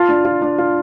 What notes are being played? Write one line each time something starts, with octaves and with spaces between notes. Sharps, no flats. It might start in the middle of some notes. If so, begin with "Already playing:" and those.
Already playing: F4 F5 A5
D4
F4
D4
F4